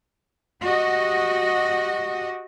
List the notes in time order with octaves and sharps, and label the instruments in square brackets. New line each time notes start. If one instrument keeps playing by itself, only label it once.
[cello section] F#4 G4 D#5